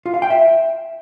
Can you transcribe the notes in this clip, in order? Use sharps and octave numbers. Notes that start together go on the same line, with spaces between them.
F4
F5
G5
E5